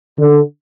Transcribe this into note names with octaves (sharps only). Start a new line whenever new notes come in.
D3